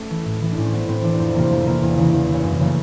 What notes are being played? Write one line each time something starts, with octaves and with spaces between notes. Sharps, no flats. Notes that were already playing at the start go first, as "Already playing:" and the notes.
Already playing: A3 C#4
E3
A2
E3
D4
A2 C#4
C4
E3 B3
A2 C4
E3 D4
F2 C4
C3 E3 A#3
F2 A3
C3 E3 A#3
E2
C#3 E3
E2
C#3 E3
F#2
C#3 E3 A#3
A3